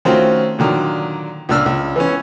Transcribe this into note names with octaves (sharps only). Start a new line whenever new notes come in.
D#3 A3 C4 C#4 F4 F#4
A#2 D3 D#3 F#3
C#2 A#2 D4 E6 F6
C#2
E3 B3 C#4